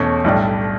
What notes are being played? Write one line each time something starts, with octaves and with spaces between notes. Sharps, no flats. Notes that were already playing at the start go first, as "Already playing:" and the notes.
Already playing: E2 B2 A3 C#4
B1 A2 G3 D4